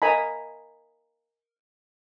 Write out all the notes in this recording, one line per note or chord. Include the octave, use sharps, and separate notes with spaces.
A#4 D#5 G#5 A#5 B5